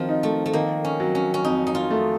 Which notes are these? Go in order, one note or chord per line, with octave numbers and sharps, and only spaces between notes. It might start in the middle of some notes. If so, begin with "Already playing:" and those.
Already playing: D#3 F3 F#3 C4
D#4
A3
A3
D#3 A#3
C#4
F#3
C#4
C#4
F2 D#4
D#4
F4
A3